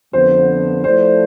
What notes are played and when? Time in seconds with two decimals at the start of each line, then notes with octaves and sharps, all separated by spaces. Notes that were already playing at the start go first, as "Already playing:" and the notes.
0.13 F2 D3 F3 B3 C5
0.84 F3 A3 E4 A4 C5 D5